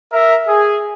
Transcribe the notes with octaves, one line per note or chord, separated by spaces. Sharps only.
A#4 E5
G#4